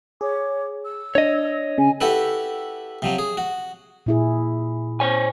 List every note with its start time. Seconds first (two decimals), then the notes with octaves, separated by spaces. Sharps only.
0.21 G#4 C#5 D6
0.85 E6
1.15 D4 C#5 D#5
1.78 C#3 G#5
2.01 E4 F#4 G4 A4 B4
3.02 C3 F3 F#3
3.18 G#4
3.37 F#4
4.06 A#2 E4 G#4
5.00 C5 C#5 G#5